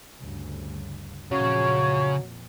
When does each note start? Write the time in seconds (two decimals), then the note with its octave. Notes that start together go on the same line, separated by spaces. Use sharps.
0.20 D2 G2 C#3
1.31 F2 A#2 C#3 F#3 C#4 C#6 G#6